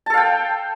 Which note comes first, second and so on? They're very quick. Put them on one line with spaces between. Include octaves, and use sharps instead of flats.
A5 A4 F5 G5